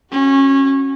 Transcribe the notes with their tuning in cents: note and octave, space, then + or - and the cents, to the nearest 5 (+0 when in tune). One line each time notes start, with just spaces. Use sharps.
C#4 -25 F#4 +0